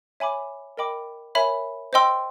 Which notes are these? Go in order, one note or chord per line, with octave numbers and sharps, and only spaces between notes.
C#5 E5 G#5 B5 D6
A#4 D#5 G5 B5 D6
A#4 C#5 E5 G#5 B5
C5 D#5 G5 C6 E6